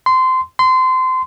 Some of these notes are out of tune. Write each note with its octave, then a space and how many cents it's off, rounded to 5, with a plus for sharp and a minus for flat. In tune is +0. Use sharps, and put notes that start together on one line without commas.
C6 -20
C6 -25